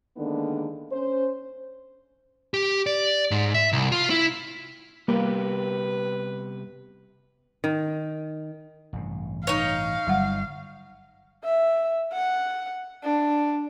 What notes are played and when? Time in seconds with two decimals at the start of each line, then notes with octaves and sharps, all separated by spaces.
0.17 D3 D#3 G#3 A#3 B3 D4
0.92 C#4 C5
2.54 G4
2.87 D5
3.31 G#2
3.54 E5
3.73 C2
3.92 F4
4.10 E4
5.08 C3 G3 A#3 B3 G4 B4
7.64 D#3
8.93 A1 G2 C3
9.47 D#4 C#5 F5
10.07 G1 F#3 G3 F#5
11.44 E5
12.13 F#5
13.03 D4